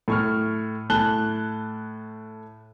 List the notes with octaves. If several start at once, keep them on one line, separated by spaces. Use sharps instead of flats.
A2 C#6 F6
A2 A5 F#6 G7